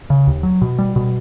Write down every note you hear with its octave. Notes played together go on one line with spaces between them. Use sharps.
C#3
D#2
F#3
B2
G3
B2